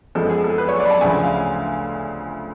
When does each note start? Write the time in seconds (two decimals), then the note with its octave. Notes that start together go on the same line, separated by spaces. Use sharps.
0.15 F#2 F3 G#3 B3 A4
0.30 G#4
0.44 A4
0.58 B4
0.69 C#5
0.80 D5
0.86 B5
0.91 A5
1.01 D2 C#3 F3 G#5
1.23 F5